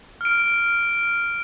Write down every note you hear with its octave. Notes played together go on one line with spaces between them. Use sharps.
F6 D7